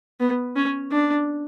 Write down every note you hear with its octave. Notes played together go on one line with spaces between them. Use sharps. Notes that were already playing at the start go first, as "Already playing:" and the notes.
B3
C#4
D4